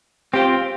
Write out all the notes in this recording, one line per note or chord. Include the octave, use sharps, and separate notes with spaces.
C4 F4 G4 C5